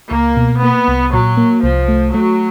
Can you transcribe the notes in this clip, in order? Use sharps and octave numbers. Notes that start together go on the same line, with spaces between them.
C#2 A#3
B2
A#3 B3
C2
A#2 F#3
A#3
C2 F3
A3
F#3 A3